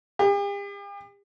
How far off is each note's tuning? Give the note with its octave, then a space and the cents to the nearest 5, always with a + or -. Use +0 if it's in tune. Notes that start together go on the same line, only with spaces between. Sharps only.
G4 +45